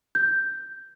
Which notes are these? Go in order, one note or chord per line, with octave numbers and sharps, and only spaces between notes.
G6